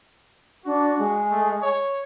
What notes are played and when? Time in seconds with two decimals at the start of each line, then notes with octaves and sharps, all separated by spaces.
0.65 D4 F#4
0.99 G#3
1.31 A3
1.62 C#5